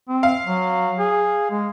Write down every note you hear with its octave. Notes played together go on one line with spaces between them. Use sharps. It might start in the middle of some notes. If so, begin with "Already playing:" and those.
C4
F5
F#3
G#4
G#3